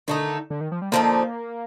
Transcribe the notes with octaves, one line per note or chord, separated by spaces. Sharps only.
D3 D#3 A3 D#4
D3
D#3
F3
G3
D3 F3 A#3 C4 D#4